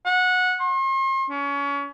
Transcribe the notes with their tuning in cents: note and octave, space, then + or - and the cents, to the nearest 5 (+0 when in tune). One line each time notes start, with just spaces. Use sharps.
F#5 -20
C6 +45
C#4 +30